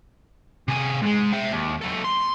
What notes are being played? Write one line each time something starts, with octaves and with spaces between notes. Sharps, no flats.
C3 G#4
G#2 G#3
E5 G5
D#2
F#3 A4
C6